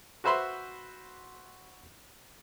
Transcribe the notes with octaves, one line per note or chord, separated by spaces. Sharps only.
F#4 B4 C5 E5 B5 C6